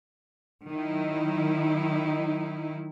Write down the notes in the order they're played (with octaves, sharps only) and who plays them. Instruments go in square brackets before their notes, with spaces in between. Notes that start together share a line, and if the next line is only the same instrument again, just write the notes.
[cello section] D#3 F#3 D#4 E4